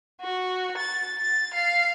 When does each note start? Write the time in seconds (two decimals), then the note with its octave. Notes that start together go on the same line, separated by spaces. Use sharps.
0.21 F#4
0.77 A6
1.18 A6
1.54 F5